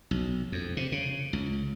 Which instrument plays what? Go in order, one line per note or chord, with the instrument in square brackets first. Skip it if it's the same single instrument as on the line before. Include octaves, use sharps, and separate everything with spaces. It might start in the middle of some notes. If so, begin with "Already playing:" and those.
[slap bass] B1
F2
C3
C#3
C#2